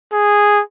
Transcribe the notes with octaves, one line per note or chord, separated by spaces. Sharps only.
G#4